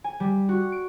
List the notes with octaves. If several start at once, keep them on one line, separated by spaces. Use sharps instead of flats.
G#5
G3
F#4
D7